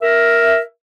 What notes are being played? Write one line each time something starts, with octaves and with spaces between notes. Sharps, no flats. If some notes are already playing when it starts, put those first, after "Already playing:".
A#4 E5